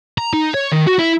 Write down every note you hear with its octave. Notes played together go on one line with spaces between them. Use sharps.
A#5
D#4
C#5
D#3
F#4
E4